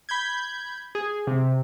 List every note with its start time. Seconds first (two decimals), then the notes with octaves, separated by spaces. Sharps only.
0.09 B5 G6 G#6
0.95 G#4
1.27 C3